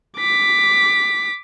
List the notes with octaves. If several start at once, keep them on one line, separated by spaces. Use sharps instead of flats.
D6 B6